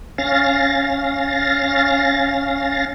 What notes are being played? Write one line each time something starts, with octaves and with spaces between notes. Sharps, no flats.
C#4 F5 A6 A#6